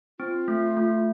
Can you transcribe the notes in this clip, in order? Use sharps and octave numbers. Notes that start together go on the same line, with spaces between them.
C4 F4
A3
A3